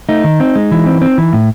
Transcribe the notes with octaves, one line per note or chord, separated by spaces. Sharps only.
A3 D#4
D#3
C4
G#3
E3
C4
C4
E3
A2